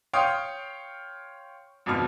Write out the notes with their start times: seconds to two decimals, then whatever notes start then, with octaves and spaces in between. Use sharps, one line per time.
0.13 C#5 F5 G5 C6 D#6
1.86 G#1 F2 B2 F6